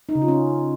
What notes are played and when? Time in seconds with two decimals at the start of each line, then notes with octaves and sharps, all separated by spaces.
0.09 D#4
0.15 C#3
0.22 F4
0.28 C#4